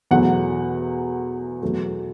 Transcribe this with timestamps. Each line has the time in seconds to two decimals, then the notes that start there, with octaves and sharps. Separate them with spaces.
0.11 E2 B2 F#3 A3 F#5
1.62 E2 B2 F#3 A3